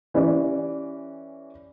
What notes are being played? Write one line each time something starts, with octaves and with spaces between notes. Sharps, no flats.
E3 C#4 G4 D5